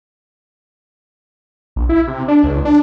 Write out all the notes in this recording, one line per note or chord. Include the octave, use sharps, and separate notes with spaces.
A#1
E4
C3
D4
C#2
D4